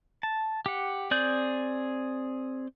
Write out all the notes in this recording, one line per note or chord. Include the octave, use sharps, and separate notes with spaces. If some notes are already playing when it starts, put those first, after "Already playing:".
A5
G4 F#5
C4 G#4 D5 G6